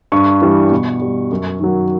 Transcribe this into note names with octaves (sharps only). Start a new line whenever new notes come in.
G2 C#6
E3 G3
B2
G3
F#2
D#3 F#3